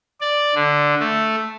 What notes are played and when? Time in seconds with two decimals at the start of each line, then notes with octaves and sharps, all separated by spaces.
0.21 D5
0.55 D3
1.00 A3